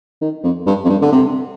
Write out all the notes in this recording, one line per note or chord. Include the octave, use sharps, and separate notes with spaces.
D#3
F2
G2
F2
G2
D3
C3